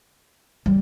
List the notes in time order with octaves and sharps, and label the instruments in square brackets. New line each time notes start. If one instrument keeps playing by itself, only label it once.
[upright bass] G3